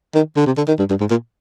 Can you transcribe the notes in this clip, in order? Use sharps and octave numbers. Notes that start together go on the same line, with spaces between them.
D#3
D3
C3
D3
D#3
G2
G2
G#2
A#2